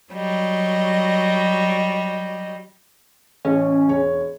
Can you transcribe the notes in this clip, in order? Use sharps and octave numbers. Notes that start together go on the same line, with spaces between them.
F#3 G3 D#5
A1 C#4
E1 C#5